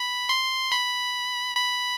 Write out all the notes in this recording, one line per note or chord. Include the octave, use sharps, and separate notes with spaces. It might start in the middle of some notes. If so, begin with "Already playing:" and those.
Already playing: B5
C6
B5
B5